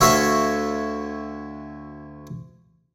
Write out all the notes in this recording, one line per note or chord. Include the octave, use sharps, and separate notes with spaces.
D2 F#4 A4 C#5 E5 F5